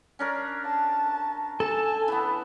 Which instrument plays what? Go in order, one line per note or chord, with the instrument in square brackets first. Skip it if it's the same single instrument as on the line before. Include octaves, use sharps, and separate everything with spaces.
[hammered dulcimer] C#4 D4 A#4
[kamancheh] A5
[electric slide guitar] A4 [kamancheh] G#5 [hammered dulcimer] A5
[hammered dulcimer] E3 B3